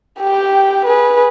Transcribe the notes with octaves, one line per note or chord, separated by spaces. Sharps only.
G4 G5
G#4 B4